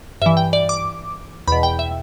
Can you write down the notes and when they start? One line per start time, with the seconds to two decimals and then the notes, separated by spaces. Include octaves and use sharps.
0.22 G2 E3 E5
0.37 G5
0.53 D5
0.69 D6
1.47 E2 B2 B5
1.63 G5
1.79 E5